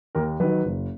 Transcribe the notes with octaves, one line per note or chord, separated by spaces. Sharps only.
D#2 A#4
D#3 F#3 B4
F#1